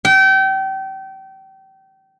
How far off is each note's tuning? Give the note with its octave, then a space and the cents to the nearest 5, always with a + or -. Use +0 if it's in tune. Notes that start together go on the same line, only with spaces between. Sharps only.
G5 -30